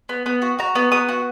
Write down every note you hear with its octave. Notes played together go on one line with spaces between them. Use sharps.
B3
B3
F#4
F#4 A#5
B3
B3 D#6
F#4